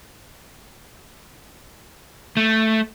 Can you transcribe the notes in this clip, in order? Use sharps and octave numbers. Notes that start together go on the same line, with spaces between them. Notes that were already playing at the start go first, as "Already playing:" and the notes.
A3